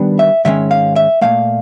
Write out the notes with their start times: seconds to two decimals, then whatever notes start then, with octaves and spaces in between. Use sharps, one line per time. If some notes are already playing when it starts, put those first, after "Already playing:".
Already playing: D#3 G3 B3 D4
0.19 E5
0.45 G#2 D#3 G#3 C#4 E5
0.71 F5
0.96 E5
1.21 A#2 F#3 A3 F5